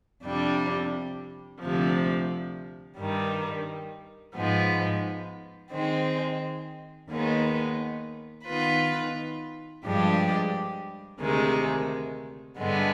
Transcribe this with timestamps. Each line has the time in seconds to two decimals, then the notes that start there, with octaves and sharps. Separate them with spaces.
0.23 F2 C3 G3 D4
1.61 D2 C3 F3
2.98 G2 D#3 G3
4.34 G#2 F3 G#3 B3
5.72 D#3 G#3 C4
7.09 D#2 D#3 G#3 B3
8.45 D#3 B3 F4 B4
9.83 G2 F3 G#3 D4 G4
11.20 D2 C3 D#3 G#3
12.57 G2 D3 G#3 B3